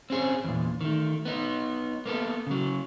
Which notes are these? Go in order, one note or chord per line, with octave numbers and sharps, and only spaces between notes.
C4 C#4 G#4
E2 A#2
D#3 A3
B3 D#4
A#3 B3 A4
C#3 F#3